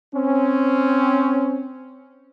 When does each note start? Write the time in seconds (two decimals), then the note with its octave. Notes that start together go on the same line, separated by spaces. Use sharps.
0.14 C4 C#4